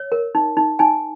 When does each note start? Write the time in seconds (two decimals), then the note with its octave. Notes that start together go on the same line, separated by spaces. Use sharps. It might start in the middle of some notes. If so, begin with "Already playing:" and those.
Already playing: C#5
0.12 A#4
0.35 D#4
0.57 D#4
0.79 D#4 G#5